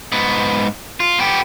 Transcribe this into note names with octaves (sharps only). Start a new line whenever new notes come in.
G#2 B3
F4
B3 G4